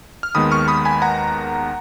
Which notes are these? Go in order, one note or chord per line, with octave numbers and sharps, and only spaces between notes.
F6
D#2 D#3 G#3 B3 B5 D#6
C#6 F6
B5 D#6
G#5 B5
F#5 A#5